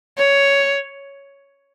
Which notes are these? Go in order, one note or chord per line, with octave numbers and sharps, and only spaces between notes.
C#5